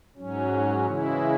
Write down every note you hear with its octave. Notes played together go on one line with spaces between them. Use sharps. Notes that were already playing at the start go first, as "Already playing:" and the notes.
G#2 F#3 C#4
C#3 E3 G#3 E4